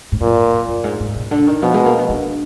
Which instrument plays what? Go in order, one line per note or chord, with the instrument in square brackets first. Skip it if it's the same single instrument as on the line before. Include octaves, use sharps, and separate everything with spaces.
[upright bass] G#2
[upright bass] F#2 [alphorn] A#2
[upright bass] F#2
G#2
G#2
B2
D3
D#3
[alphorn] B2 [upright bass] F3
[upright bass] G#3
A#3
B3
D4